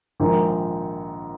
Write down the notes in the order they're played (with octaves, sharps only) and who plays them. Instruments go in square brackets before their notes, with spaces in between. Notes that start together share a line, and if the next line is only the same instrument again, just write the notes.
[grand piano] A#1 G#2 D#3